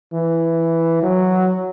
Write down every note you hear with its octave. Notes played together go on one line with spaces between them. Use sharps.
E3
F#3